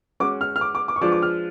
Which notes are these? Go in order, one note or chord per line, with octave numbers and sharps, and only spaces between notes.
G#3 C#4 F#4 D6
F6
F6
D6
D6
D6
C#6
F3 G#3 D4 F4 B4 D6
D6
F6